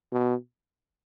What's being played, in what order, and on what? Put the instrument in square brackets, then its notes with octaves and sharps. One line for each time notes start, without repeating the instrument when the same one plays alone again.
[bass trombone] B2